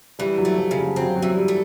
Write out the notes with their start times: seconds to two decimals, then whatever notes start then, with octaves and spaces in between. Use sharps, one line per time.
0.19 E3 G3
0.38 F#3
0.45 A3
0.57 F3
0.71 C#3
0.77 F#3
0.96 F#3 C4
1.16 F#3
1.22 E3
1.35 G3
1.48 A3